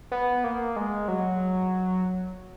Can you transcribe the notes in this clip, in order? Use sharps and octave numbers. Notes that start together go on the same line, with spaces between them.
B3
A#3
G#3
F#3